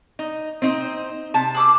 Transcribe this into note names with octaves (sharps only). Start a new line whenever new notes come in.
D#4
C4 D#4 C5
C3 A5
G#4 D6 E6